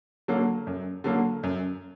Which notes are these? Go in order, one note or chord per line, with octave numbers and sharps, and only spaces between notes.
D3 F#3 A#3
F#2
D3 F#3 A#3
F#2